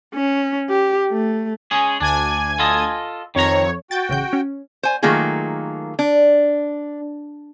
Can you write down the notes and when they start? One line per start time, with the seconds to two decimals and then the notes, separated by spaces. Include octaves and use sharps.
0.14 C#4
0.69 G4
1.11 A3
1.71 G#3 C#4 G#4
2.00 D2 D4 G#5 G#6
2.59 F4 A4 D#5
3.35 F2 D#3 C#5 A#5
3.91 F#4 G5 G6 A6
4.09 A1 C#3 G6
4.33 C#4
4.83 C5 G#5
5.03 D#3 F#3 A3 A#3 F4 G#4
5.99 D4